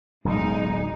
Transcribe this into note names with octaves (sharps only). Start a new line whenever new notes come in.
D1 B1 D3 G#3 D#4